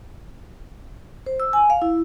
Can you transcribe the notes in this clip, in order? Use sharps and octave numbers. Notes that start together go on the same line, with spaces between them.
C5
E6
G#5
F5
E4